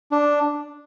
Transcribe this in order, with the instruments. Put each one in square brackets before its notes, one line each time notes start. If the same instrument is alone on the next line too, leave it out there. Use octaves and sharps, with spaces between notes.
[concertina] D4